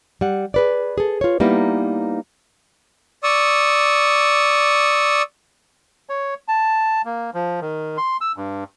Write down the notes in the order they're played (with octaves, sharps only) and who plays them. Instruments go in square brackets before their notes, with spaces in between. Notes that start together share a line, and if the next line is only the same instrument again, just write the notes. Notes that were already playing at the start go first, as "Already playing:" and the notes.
[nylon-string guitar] G3 F#5
G#4 B4 D5
G#4 A4
F4 C#5
G3 A#3 B3 D#4 E4
[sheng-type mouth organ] D5 C#6 D#6 E6
[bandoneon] C#5
A5
A#3
F3
D#3
C6
E6
G2